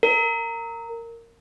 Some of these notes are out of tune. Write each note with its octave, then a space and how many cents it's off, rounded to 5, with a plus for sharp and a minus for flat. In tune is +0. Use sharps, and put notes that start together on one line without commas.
A#4 -15